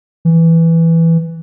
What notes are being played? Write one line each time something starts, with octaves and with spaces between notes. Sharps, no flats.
E3